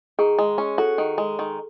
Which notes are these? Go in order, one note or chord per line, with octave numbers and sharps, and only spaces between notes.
D#3 G#4
G#3
C#4
F#4 A4
D#3
G#3
D#3